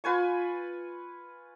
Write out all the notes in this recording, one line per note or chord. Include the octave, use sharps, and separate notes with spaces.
F4 B4 G#5 C#6